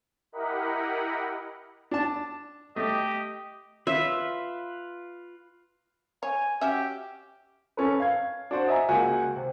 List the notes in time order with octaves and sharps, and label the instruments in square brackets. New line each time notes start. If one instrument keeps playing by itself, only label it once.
[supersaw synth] E4 G4 A#4 D#5 F#5 B5
[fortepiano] D4 A5
[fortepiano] A3 [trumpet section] G4 D#5
[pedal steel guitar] F4 B4 [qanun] E5
[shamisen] C#5 [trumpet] G#5
[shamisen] C#4 F#4 E5 [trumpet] G4
[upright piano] C#4 A4 B4
F5 G#6
D4 F#4 C5
D#5 E5 G#5 A#5
C#2 A#3 F#4 F#5 G#5
C3